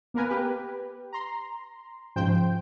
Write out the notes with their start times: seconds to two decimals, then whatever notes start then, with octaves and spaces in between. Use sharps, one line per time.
0.14 A#3 B3 A#4 B4 G#5
0.29 G4 B4
1.13 A#5 C6
2.16 G#2 C#3 F3 C5 G5 G6